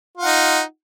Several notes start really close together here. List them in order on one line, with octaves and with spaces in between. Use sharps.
F4 F#5 D#4